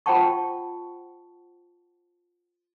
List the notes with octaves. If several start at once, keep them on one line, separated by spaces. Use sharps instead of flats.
F4 C5 F#5 G5 A5 C#6